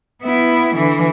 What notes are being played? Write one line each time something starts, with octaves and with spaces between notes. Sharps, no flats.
B3 E4
D3 E3